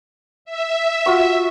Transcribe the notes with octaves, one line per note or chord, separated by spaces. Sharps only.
E5
F4 F#4 C#6